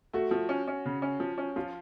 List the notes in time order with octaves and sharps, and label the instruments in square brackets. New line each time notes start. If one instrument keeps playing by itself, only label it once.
[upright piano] A3 [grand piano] F#4
[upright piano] F3
C#4
C#4
C#3
C#4
F3
C#4
[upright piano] F3 [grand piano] F4